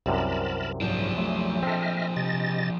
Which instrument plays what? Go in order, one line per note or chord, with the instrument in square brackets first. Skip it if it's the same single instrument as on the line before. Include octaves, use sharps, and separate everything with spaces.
[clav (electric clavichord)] C2 F#2 C3 [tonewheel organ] A#4 A5 B5
[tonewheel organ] G#2 F#3 [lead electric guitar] F3 D4
[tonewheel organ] F#3 A3
[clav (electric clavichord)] C4 A4 [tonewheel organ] D#5 E5 F6
[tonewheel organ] C3 D#5 A6